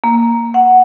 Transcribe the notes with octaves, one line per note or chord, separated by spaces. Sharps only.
A#3
F#5